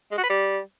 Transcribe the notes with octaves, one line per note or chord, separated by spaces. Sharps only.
G#3
F#4
B4
G3